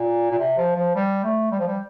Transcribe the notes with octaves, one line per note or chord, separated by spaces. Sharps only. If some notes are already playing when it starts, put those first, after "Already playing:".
Already playing: A#2
A#2
C3
F3
F3
G3
A3
G3
F3
G3